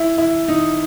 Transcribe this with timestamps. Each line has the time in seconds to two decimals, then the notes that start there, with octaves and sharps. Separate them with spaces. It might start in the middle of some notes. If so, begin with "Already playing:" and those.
Already playing: E4
0.18 E4
0.48 D#4